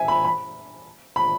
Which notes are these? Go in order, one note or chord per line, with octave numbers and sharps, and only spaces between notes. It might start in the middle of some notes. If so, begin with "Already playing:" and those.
Already playing: E5 G#5
B5
B5
B5